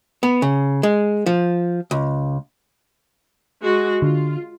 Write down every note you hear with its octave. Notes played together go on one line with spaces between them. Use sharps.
B3
C#3
G#3
F3
C#2
G#3 F#4
D3 F4